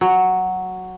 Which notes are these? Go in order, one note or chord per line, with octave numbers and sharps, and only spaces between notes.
F#3